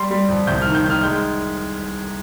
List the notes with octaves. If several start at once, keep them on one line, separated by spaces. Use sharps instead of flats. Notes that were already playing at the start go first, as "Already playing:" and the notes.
Already playing: G3 C6
G3
F2
C2 G6
F6
D#3
G6
D#3
F6
G#3 G6